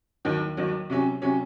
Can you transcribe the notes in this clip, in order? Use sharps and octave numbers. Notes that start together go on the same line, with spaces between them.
D#2 D#3 F#3
D#2 D#3 F#3
C3 F#3 C#4
C3 F#3 C#4